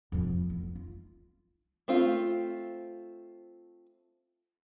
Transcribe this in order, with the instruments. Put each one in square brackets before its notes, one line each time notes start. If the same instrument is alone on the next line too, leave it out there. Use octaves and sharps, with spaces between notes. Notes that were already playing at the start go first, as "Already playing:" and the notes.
[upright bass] F2 F3
B3
F4
[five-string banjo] A3 C4 F4